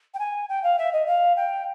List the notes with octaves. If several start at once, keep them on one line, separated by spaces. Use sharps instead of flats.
G5
G#5
G5
F5
E5
D#5
F5
G5